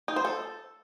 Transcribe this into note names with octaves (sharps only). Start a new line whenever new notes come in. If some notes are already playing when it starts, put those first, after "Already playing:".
D#4
C5
A4